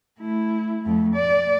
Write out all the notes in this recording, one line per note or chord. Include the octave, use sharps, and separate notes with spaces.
A3 E4
F2 A3
D5